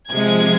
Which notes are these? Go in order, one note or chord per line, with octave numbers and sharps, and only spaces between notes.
C3 F3 G#3 G#6